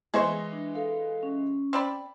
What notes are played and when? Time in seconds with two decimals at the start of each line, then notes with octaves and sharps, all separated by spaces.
0.14 E3 G#3 G#4 C5 D#5 C#6
0.52 D4
0.74 A4 F5
1.23 C#4
1.73 C4 D5 B5